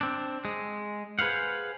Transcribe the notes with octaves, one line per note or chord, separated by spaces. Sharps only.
C4 D4
G#3
G#4 B4 C5 F5 F#5